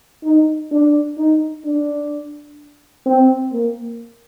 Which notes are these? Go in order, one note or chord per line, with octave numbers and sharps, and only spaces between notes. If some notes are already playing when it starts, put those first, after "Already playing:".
D#4
D4
D#4
D4
C4
A#3